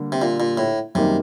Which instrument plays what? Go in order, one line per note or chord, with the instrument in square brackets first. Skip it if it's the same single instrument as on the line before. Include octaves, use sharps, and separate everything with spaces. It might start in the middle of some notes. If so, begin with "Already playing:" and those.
Already playing: [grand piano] D3 G3 A#3
[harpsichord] C3
A#2
A#2
A2
[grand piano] F#2 D#3 G3 A#3 D#4 [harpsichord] C3